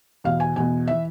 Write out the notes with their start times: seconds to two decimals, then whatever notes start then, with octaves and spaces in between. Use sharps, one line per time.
0.24 E2 B2 F5
0.40 G#5
0.56 E2 B2 G#5
0.88 E3 E5